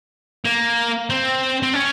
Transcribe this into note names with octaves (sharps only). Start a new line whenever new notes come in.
A#3
C4
C4
C#4